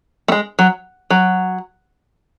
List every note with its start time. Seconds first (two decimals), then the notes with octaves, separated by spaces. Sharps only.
0.28 A3
0.32 G#3
0.59 F#3
1.10 F#3